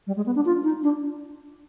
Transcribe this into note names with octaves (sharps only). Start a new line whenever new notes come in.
G3
G#3
B3
D4
F4
D#4
D4